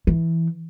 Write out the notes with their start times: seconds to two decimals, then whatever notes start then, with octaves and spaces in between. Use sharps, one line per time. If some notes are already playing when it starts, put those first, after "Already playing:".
0.07 E3